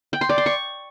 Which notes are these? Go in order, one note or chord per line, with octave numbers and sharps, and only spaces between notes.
G5
C6
D5
C6
C#6